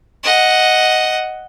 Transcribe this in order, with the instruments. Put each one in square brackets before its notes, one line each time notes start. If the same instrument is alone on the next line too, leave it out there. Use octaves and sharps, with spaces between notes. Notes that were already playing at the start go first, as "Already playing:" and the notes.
[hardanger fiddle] D#5 F#5